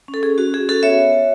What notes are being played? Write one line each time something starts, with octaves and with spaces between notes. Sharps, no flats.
C#4
A4
C#4 G#4
C#4 F#4
C#4 G#4
C#4 F#4 A4
B3 C#5 E5
F#4
F#4